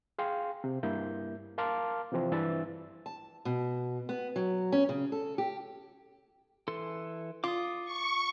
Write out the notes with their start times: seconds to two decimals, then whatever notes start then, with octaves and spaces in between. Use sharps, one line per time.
0.19 G#4 F5 G5 C6
0.64 C3
0.83 G2 A#3 E4 G6
1.58 A#4 F5 A5 C6 D6 F6
2.12 C3 E3 F3 C4
2.32 G2 E3 D4 E6 A6
3.06 A5
3.45 B2
4.09 B3
4.36 F#3
4.72 C#4
4.89 C#3
5.12 A4
5.38 G4
6.68 E3 A4 C6
7.44 F4 D6 D#6
7.85 C#6